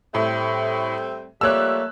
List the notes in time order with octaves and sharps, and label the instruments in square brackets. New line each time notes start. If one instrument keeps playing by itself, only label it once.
[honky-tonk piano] A2 [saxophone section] G3 A3 C4
[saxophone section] F3 G3 A3 [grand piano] A#3 C#5 D6 [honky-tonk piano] E6 F#6